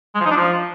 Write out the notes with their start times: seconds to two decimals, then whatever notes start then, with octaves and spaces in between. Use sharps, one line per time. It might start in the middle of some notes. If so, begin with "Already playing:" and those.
0.15 G#3
0.20 F3
0.26 D#4
0.31 D4
0.36 F3